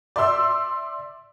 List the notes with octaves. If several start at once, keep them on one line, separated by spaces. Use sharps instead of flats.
D5 E5 C6 E6